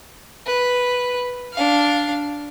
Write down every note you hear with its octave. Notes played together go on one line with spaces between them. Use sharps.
B4
D4 F5